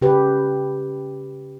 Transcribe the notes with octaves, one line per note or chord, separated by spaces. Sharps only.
C#3 G4 B4